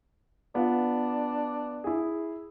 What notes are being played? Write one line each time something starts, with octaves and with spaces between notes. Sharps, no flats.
B3 D4 F4
E4 G#4